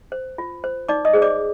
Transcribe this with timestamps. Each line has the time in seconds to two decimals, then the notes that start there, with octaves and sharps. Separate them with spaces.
0.12 C5
0.38 F4
0.64 C5
0.89 D#4 D5 D6
1.05 D#5 D#6
1.13 G#4 C5
1.22 D5 D6